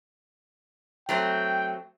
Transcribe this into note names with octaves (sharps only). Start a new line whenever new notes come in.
F#3 A3 C4 G5